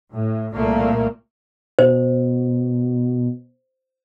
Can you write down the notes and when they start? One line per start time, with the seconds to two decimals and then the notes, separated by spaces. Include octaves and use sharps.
0.11 A2
0.54 C2 A#2 A3 A#3
1.79 B2 C5